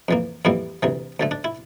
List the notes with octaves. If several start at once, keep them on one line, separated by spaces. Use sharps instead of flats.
F2 E3 A#3
F2 E3 G3 A#3 E4
D2 C3 E3
D2 D3 A3
D4
E4